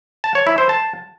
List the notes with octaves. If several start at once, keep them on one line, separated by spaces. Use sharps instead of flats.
A5
C#5
E4
C5
A5